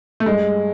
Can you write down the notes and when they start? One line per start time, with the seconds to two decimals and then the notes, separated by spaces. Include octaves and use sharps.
0.20 A3
0.26 G2 G#3